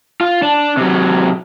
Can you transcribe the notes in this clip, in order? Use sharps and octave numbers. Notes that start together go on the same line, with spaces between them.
F4
D4
C3 F#3